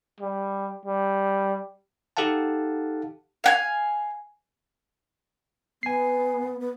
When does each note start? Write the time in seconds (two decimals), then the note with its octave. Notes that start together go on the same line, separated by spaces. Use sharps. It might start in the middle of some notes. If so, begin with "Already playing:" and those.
0.21 G3
0.86 G3
2.17 D#4 G4 A4 F5 F#5 A5
3.44 F5 F#5 G#5
5.83 B3 G#5 C7
6.60 B3